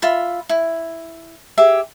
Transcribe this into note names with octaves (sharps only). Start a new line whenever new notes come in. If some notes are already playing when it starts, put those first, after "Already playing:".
F4 E5 B5
E4
G4 G#4 E5